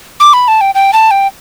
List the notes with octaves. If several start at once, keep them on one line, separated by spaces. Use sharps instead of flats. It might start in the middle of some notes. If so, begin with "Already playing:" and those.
D6
B5
A5
G5
G5
A5
G5